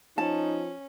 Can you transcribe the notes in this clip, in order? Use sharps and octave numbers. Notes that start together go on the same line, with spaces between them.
F3 C#4 D#4 A5